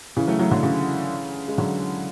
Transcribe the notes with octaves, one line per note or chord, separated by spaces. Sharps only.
C#3 E3
F#3 A3
F#3 A3
D3 F#3
C#3 E3
G#3
D3 F#3